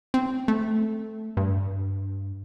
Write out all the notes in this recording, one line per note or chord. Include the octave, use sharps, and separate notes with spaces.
C4
A3
G2